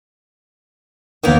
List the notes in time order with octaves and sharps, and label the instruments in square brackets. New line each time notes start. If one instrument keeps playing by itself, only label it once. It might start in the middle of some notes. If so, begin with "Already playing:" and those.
[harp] D#2 D#4 [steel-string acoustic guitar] A#3 B3 A#4